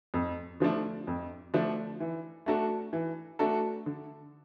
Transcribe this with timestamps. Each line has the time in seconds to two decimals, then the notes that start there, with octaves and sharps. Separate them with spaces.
0.14 F2
0.60 D3 F3 A3 D4
1.07 F2
1.54 D3 F3 A3 D4
2.00 E3
2.46 A3 D4 F#4 A4
2.93 E3
3.39 A3 D4 F#4 A4
3.86 D3